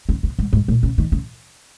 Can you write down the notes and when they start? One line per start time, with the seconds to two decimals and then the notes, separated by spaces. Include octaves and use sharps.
0.09 C#3
0.23 C3
0.39 G#2
0.53 G#2
0.68 A#2
0.83 C#3
0.98 D#3
1.12 C#3